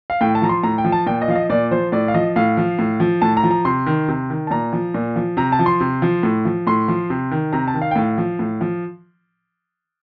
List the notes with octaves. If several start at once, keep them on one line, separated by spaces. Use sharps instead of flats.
F5
A2 G5
A5
F3 A#5
C6
A2 A#5
G5
F3
A5
A#2 G5
D#5
F3 F5
D#5
A#2 D5
F3 C5
A2 D5
F5
F3 D#5
A2 F5
F3
A2
F3
A2 A5
A#5
F3
A#5
C3 C6
D#3
C3
D#3
A5
A#2 A#5
F3
A#2
F3
C3 A#5
A5
F3
C6
C3
F3
A2
F3
A2 C6
F3
C3
D#3
C3 A#5
A5
D#3
F5
G5
A2 F5
F3
A2
F3